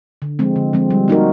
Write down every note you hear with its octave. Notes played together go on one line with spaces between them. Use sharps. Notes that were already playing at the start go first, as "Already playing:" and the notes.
D3
F3 G#3 C4
D3
F3 G#3 C4
G3
A#3 D#4 F#4 A#4